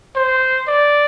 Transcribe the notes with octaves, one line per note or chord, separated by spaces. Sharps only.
C5
D5